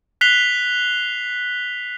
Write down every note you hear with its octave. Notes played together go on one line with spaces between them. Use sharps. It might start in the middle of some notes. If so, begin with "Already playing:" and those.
F#6 B6 C7 F7 G7